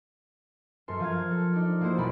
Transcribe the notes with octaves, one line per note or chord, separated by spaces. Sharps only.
F#2 A4 A#4 C6 E7
F3 F5 G#6
A4
D#4 D5
F3 A#3 E4 F#4 C5
F1 B1 F#3 D5 B5